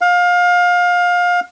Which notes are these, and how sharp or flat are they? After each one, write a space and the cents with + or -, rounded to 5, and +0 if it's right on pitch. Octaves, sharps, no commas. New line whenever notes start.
F5 +25